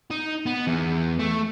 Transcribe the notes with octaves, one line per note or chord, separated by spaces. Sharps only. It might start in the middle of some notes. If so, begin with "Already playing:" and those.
D#4
B3
E2
A3